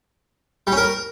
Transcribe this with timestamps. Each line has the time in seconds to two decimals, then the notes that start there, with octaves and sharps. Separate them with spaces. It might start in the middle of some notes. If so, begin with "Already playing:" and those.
0.67 G3
0.72 C#4
0.77 A#4